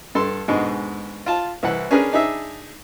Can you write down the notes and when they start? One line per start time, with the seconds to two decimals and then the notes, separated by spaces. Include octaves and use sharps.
0.15 G2 A4 C6
0.48 G#2 B2 D3 G#3
1.26 F4 A5
1.63 C2 E3 F#5
1.91 C#4 D4 G#4 A#4 B4
2.12 D4 D#4 G#4 E5